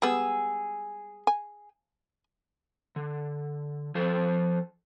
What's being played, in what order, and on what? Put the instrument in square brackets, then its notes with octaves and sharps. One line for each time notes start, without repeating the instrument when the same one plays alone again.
[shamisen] G3 G#3 B3 [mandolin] G#4 E6
[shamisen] G#5
[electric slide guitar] D3
F3 A4 C5